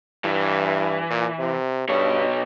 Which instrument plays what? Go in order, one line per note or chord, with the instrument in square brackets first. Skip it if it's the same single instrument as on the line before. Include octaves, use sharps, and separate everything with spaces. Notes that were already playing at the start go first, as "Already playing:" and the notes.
[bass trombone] G2 [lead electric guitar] E3
[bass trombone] A#2
C3
[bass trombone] G2 [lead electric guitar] B2 C#5